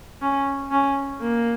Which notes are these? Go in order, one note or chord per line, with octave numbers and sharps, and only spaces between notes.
C#4
C#4
A#3